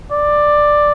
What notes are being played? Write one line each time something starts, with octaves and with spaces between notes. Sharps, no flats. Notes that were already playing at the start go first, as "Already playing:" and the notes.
D5